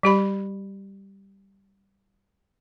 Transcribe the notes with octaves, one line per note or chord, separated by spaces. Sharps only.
G3 G4 B5